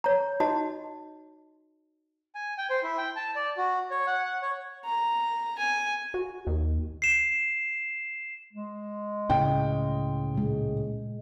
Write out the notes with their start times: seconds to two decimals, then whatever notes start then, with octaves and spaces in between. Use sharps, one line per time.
0.04 C#5 A#5
0.40 D#4 F#4 D#5 A5
2.35 G#5
2.58 G5
2.70 C5
2.83 E4
2.98 G5
3.16 A5
3.36 D5
3.57 F#4
3.91 C#5
4.07 F#5
4.24 F#5
4.42 C#5
4.85 A#5
5.59 G#5
6.14 F#4
6.47 D#2
7.02 C7 E7
8.53 G#3
9.30 C#2 A2 C#3 G5
10.35 A#2 G#3